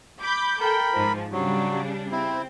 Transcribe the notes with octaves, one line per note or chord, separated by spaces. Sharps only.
B5 D6 G6
A4 A#4 G5 B5
G#2 F3
C#3 F#3 G3 D4
C4 E4